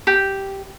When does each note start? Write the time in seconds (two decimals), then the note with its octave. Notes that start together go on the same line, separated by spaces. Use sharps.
0.07 G4